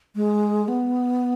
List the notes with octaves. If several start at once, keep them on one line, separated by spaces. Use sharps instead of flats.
G#3
B3